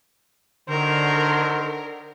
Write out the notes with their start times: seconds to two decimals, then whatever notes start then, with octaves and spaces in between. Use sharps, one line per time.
0.69 D3 D#3 F#3 A#4 C5